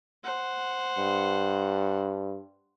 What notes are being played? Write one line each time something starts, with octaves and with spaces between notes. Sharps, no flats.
C5 F#5
G2